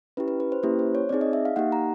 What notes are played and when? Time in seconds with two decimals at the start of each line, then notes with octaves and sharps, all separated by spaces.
0.17 C#4 E4 G4 B4
0.28 B4
0.40 B4
0.52 C5
0.63 A#3 C#4 E4 G4 B4
0.79 C5
0.95 C#5
1.09 C4 D#4 G#4 D5
1.21 D#5
1.33 E5
1.45 F5
1.56 A#3 D#4 G4 F#5
1.72 A#5